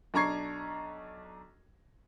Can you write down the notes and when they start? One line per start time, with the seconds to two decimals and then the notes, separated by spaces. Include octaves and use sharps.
0.14 B1 D4 A#5 C#6 G#6 C7